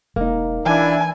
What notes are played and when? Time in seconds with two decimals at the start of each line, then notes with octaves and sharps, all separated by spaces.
0.16 E1 A#3 D#4
0.66 E3 D4 E4 G#5